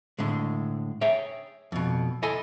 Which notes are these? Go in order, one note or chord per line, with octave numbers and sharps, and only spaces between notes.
A2 D3 G#3
G#4 C#5 E5 G5
F2 B2
E4 A4 D#5 G#5 C6